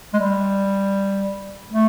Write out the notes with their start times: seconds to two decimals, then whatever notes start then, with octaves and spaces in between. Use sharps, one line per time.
0.14 G#3
0.19 G3
1.71 A3